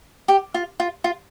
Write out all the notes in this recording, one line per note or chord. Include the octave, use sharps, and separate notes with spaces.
G4
F4
F4
F4